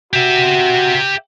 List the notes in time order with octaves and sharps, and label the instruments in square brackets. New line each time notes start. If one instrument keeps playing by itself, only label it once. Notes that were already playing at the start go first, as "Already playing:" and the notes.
[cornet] F#4 [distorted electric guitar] G4 E5